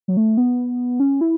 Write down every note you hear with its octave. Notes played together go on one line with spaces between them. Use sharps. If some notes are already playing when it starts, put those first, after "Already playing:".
F#3
A3
B3
C#4
E4